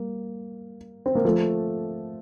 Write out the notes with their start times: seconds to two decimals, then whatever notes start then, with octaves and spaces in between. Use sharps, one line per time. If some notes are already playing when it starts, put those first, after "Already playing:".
Already playing: G3 A#3
1.06 C4
1.15 A#3
1.25 F3 A3